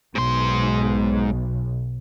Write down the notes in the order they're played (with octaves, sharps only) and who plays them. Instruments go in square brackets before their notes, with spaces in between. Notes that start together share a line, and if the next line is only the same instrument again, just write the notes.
[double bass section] B1 [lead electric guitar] G#2 C6